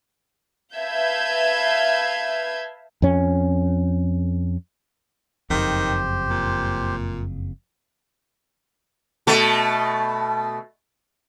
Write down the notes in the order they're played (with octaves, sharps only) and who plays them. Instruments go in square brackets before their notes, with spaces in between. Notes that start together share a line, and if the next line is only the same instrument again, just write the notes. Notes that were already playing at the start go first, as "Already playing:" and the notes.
[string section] B4 E5 F5 A5 G6 G#6
[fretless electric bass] F2 C#4
[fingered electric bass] F#1 F2 [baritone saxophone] D#3 [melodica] G4 C5
[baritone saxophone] A#2
[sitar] B2 A3